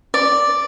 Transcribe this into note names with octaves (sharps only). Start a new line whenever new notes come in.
D5